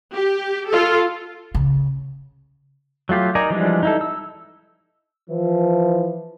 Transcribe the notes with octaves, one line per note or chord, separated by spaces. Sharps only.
G4
F4 A4
C#3
F#3 A3 F4 G4
D#4 A#4 D5 G#5 A#5
E3 F3 G3 G#3 D4
D#4 E4 A4
E6
E3 F3